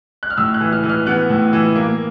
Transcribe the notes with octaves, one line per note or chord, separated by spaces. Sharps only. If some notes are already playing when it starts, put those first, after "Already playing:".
F#6
F6
A2 E6
F#6
E3
F6
E3
F6
B3 F#6
A2
E3
A#3